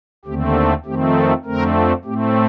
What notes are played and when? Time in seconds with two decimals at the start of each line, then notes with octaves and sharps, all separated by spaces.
0.25 D#2 D3 A3 C4 G4
0.56 A4
0.85 F2 D#3 A3 C4 G4
1.15 A4
1.45 F2 D3 A3 C4 A#4
2.04 A2 A3 C4 G4